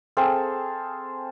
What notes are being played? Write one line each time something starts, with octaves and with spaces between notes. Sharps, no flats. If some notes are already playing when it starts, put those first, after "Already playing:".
C4 G#4 A4 F5